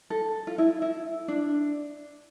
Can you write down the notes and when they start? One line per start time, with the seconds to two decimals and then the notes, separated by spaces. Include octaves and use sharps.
0.10 A4
0.47 F4
0.58 E4
0.82 E4
1.28 D4